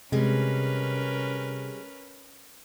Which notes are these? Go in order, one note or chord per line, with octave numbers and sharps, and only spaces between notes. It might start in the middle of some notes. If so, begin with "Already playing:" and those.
C3 G3 G#3 C#4 A#4 B4